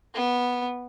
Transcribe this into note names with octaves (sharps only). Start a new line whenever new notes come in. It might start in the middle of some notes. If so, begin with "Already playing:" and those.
B3